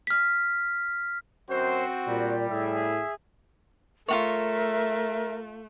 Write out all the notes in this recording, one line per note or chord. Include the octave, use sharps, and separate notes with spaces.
F6 B6
F#2 C4 F#4 C5
A#2 G3
A2 G#4 E5
A3 F4 F#4 A#4 C#5 E5